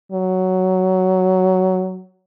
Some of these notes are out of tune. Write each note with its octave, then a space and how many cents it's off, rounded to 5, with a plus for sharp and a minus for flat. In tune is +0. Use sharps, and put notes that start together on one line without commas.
F#3 +10